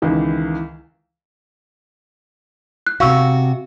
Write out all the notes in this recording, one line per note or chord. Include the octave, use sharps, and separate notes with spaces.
C#2 D#3 E3
F#6
C3 F#4 F5 C#6 E6